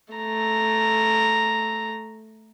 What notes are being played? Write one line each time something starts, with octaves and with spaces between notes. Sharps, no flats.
A3 A#5